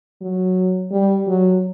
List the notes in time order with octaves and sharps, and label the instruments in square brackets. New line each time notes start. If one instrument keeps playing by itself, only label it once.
[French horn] F#3
G3
F#3